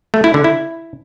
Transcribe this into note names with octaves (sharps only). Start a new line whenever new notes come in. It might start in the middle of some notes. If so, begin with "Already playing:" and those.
A3
E4
D3
E4